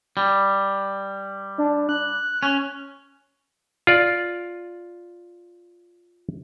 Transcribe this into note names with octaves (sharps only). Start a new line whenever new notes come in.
G3
D4
F#6
C#4
F4 D5